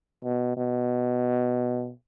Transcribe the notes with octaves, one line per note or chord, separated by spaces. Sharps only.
B2
B2